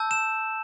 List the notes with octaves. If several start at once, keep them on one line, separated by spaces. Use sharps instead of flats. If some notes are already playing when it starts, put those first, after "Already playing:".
Already playing: A5 E6 G6
E7